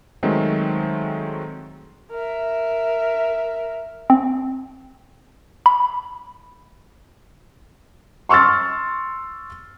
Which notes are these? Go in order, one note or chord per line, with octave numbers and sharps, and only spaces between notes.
D#3 F#3 G#3 A3 C4
A#4 E5
C4
B5
C6 C#6 E6 F6 A6